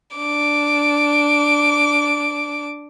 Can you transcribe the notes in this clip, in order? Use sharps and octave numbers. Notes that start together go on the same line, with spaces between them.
D4 D6